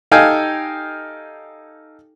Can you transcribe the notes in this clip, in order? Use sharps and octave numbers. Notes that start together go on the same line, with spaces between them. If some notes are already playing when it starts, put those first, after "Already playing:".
D#4 G4 A4 F5 G5 G#5